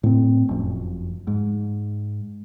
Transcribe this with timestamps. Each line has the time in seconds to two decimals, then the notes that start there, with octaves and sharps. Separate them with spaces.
0.03 A2 C4
0.49 F#1 F2
1.27 G#2